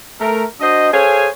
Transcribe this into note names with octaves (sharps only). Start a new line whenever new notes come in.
A3 A#4
D4 F#4 C5 D#5
G#4 A4 C5 C#5 F5 G#5